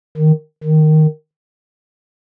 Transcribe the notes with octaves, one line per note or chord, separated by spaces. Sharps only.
D#3
D#3